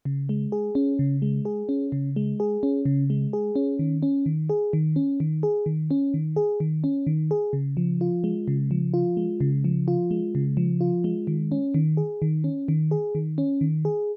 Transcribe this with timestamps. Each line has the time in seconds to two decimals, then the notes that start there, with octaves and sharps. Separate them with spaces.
0.05 C#3
0.29 G#3
0.52 G#4
0.75 C#4
0.99 C#3
1.22 G#3
1.45 G#4
1.69 C#4
1.92 C#3
2.16 G#3
2.40 G#4
2.63 C#4
2.85 C#3
3.10 G#3
3.33 G#4
3.56 C#4
3.79 D#3
4.02 C#4
4.26 D#3
4.49 G#4
4.73 D#3
4.96 C#4
5.20 D#3
5.43 G#4
5.66 D#3
5.91 C#4
6.14 D#3
6.36 G#4
6.60 D#3
6.84 C#4
7.07 D#3
7.31 G#4
7.53 C#3
7.77 F3
8.01 F4
8.24 G#3
8.48 C#3
8.71 F3
8.94 F4
9.17 G#3
9.40 C#3
9.64 F3
9.88 F4
10.11 G#3
10.35 C#3
10.57 F3
10.81 F4
11.04 G#3
11.27 D#3
11.52 C#4
11.74 D#3
11.97 G#4
12.22 D#3
12.44 C#4
12.68 D#3
12.91 G#4
13.15 D#3
13.38 C#4
13.61 D#3
13.85 G#4